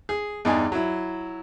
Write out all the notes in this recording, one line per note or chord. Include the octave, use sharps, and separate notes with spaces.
G#4
E2 G2 D#4 G#5
F#3 E4